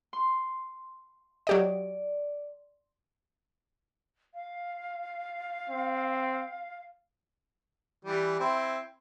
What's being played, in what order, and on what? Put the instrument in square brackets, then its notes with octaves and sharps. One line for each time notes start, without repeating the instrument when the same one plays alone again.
[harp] C6
[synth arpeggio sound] F#3 G4 D#5 [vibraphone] D5
[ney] F5
[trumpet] C4
[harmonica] E3 G3
C4 E4